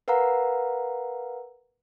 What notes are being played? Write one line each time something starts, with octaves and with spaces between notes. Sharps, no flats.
A#4 B4 F5 F#5 A#5